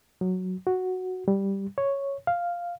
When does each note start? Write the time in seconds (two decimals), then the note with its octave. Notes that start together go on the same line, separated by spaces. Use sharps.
0.21 F#3
0.67 F#4
1.28 G3
1.78 C#5
2.27 F5